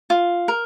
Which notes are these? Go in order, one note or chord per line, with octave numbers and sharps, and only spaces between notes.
F4
A#4